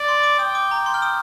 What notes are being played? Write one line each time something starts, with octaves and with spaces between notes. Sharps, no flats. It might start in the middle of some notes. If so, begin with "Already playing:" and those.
Already playing: D5
C6
D6
G5 D#6
D6
A#5
C6
F6
D#6